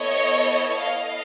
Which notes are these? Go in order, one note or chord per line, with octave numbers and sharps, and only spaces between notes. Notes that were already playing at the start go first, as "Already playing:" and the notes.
Already playing: B3 E4 A4 C#5 D#5
D#5 F5